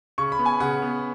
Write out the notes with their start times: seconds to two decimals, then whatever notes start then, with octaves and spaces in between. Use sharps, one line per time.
0.18 C#3 C#6
0.32 B5
0.39 B3
0.46 G#5
0.60 C#3 F#5
0.82 B3